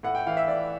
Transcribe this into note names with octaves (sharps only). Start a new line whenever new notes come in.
A2 F#5
G5
E3 F5
E5
A2 D5